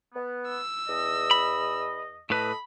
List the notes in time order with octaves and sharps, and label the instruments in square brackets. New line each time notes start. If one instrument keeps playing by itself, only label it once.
[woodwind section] B3
[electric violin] E6
[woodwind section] E2 D#5
[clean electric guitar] B5
[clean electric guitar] A2 B4 [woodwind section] A4 D#5 [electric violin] B5